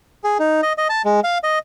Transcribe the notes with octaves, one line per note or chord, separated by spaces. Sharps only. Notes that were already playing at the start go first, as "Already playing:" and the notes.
G#4
D#4
D#5
D#5
A5
G#3
F5
D#5